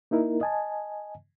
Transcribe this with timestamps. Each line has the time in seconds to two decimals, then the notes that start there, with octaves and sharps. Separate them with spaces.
0.11 A#3 D#4 E4 A#4
0.41 D#5 G#5 A5